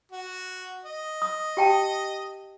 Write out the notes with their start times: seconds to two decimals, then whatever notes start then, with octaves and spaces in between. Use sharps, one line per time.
0.12 F#4
0.85 D#5
1.22 D#6
1.57 G4 G5 A5